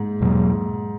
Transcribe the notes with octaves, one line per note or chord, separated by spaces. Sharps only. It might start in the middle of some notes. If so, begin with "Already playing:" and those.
Already playing: G#2
E2 B2 F#3 A#3